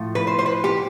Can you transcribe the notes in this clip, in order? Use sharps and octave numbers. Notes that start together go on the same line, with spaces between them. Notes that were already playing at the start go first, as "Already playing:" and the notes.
Already playing: A2 F3
B4
C5
C5
B4
G4